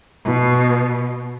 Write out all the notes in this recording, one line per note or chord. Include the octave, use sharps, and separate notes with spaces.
B2